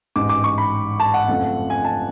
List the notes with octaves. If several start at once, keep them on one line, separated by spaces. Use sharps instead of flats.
A1 G#2 G#3 D6
D6
C#6
B5
A5
F#5
F#1 F2 F3 A3
G#5
A5